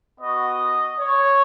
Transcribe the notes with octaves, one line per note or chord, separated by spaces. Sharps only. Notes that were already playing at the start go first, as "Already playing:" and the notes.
B3 F#4 D#5
C#5